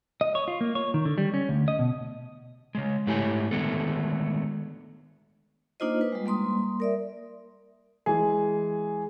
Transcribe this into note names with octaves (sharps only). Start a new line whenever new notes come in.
D#5
C#5
F4
A#3
C#5
D#3
D3
G3
C#4
D2
D#5
B2
C#3 G#3
G#2 A3 E4 G4 C#5 G#5
D3 D#3 G#3 A3 B3 A4
A#3 D4 D#4 F4 C5 D#5
B4
G3 G#3
G3 A#3 C6 D#6
A#4 D5 E5
E3 G#3 G#4